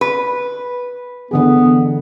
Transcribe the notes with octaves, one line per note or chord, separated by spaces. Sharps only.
B4
D3 E3 B3 G#4